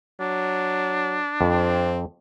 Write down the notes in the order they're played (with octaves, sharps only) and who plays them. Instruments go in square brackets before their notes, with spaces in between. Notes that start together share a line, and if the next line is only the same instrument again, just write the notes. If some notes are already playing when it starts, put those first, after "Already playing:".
[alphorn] F#3 [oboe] D4
[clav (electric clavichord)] F2 [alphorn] C4